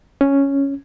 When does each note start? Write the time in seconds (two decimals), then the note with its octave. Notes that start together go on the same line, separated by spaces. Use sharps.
0.21 C#4